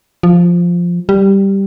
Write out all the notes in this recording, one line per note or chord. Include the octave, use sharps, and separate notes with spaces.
F3
G3